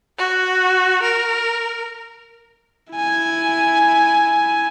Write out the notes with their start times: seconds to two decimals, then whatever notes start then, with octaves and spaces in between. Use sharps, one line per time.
0.18 F#4
1.02 A#4
2.93 E4 G#5